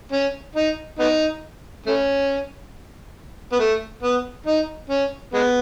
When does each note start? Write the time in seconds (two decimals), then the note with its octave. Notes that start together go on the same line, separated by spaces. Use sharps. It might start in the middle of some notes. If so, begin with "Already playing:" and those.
0.12 C#4
0.55 D#4
0.99 B3 D#4
1.86 A3 C#4
3.52 B3
3.60 A3
4.03 B3
4.46 D#4
4.90 C#4
5.34 G#3 B3